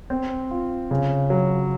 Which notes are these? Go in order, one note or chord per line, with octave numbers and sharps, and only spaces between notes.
C4
F4
C#3
F#3